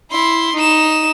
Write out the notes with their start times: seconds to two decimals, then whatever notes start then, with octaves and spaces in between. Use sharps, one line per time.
0.11 E4 C6
0.56 D#4 E7